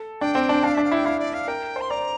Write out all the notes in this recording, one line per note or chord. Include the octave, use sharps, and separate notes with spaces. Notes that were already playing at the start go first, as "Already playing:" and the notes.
Already playing: A4
D4 G5
C4
D4
D4 F5
D4 E5
F5
E4 G5
E4 F5
D5
F5
A#4 G5
C5
C6
D5 A#5